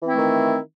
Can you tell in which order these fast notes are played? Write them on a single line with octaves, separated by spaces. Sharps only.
E3 C4 E4 A3 D#3